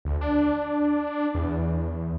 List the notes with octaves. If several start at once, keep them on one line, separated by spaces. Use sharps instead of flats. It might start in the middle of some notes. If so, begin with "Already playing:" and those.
D2
D4
E2